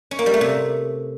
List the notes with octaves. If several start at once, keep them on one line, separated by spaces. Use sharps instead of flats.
C#4
A#3
G3
A3
C3